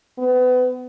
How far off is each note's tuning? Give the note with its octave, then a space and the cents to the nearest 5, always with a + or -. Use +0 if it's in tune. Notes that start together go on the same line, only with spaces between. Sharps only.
B3 +30